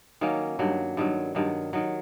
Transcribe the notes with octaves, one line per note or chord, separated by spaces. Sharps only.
D#3 F#3 A#3 C#4
G2 D#3 F#3
G2 D#3 F#3
G2 D#3 F#3
D#3 F#3